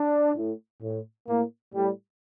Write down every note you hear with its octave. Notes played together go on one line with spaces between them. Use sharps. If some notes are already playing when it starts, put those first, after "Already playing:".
Already playing: D4
A2
A2
A2 A#3
A2 G3